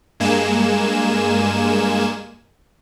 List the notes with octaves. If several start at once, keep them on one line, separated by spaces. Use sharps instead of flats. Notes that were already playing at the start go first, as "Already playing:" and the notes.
G2 G#3 A#3 G#5 E7